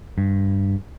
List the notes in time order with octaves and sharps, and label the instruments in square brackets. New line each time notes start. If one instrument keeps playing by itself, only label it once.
[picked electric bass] G2